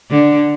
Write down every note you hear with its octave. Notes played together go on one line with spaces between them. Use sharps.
D3